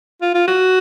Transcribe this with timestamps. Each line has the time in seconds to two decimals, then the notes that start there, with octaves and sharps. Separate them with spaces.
0.22 F4
0.34 F4
0.47 F#4